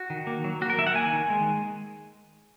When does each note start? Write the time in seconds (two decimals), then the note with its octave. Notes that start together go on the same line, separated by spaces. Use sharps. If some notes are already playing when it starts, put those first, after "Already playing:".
Already playing: F#4
0.10 D#3
0.27 A#3
0.44 F#3
0.61 A#3 F#4
0.70 A#4
0.78 D#3 E5
0.87 F#5
0.95 A#3 G#5
1.13 D#3
1.30 G#3